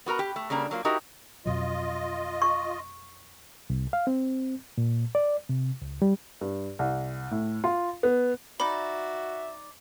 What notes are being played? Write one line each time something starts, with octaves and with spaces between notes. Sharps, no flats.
B3 F#4 A#4 A#5
G4
A3
C#3 G3 A#3 D4
F#3 A#3 F4
D#4 E4 F#4 G4 A#4
F2 B2 F#3 F4 D#5
C#6
C2
F5
C4
A#2
D5
C3
C#2
G3
G2
C2
A2
F4
B3
D#4 F#4 D5 E5 B5